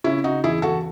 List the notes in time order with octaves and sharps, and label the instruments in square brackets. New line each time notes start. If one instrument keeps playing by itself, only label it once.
[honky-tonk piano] C#3 [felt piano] C#4 E4
[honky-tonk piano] C#3 [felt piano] D#4 F#4
[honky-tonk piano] E2 [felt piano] E4 G#4
[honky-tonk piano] E2 [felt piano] F#4 A4